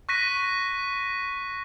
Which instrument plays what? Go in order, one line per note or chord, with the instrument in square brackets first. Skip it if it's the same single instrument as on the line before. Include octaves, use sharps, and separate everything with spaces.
[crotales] C#6 F#6 A#6 B6 D#7